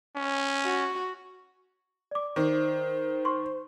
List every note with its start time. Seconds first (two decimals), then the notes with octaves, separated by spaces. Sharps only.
0.16 C#4
0.65 F#4
2.11 D5 D6
2.36 D#3 C5
3.25 C6 C#6